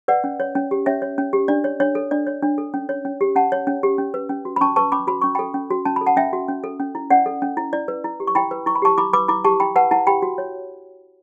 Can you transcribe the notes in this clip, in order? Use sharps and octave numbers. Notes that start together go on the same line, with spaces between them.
B4 D5 F#5
C#4
C#5
C#4
G4
C#4 C#5 E5
C#5
C#4
G4
D4 D5
C#5
D4 C#5
A4
D4 D5
C#5
D4
A4
C#4
C#5
C#4
G4
C#4 F#5 A5
C#5
C#4
G4
C#4
B4
C#4
F#4
B5
C#4 A5 C#6
B4 A5 C#6
C#4 B5 D6
F#4 B5
C#4 C#6
A4 G5 B5
C#4
F#4
C#4 A5
A4 B5
F#5 A5
C#4 E5 G5
F#4
C#4
A4
C#4
E4
C#4 D5 F#5
A4
C#4
E4
E4 D5
B4
E4
G4
C#6
E4 G5 B5
B4
E4 C#6
B5
G4 A5 C#6
E4 B5 D6
B4 B5 D6
E4 B5 D6
G4 A5 C#6
E4 G5 B5
B4 F#5 A5
E4 F#5 A5
G4 G5 B5
F#4
C#5